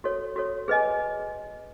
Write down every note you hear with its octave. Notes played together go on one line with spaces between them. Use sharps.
F#4 A4 C#5
F#4 A4 C#5
G#4 B4 D#5 G#5